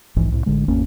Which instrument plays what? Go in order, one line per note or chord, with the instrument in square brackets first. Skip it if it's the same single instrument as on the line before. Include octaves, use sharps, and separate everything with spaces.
[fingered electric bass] E1 A#1 G#2 E3
C2 A2
A1 D3 G#3
G#1 E2 A#3 C#4